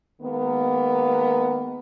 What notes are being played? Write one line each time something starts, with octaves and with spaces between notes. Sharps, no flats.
D#3 G#3 A#3 B3